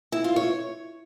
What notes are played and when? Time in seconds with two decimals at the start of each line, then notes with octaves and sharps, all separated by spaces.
0.12 E4
0.24 F4
0.36 C#5